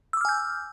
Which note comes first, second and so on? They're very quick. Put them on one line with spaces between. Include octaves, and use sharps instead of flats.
E6 D6 F6 G#5 G6